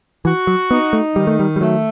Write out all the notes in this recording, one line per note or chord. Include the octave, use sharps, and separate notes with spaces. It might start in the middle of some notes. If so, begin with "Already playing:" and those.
E3 F#4
F#3
B3 D#4
A3
D#3 G3
A3
G3
G3
F#3 A3